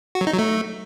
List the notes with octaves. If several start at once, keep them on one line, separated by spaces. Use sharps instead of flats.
F#4
F#3
D#4
F#3
A3